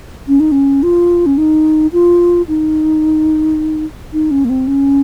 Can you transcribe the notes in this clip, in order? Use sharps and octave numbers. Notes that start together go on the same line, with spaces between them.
C#4
D#4
C#4
F4
C#4
D#4
F4
D#4
D#4
C#4
A#3
C4
C#4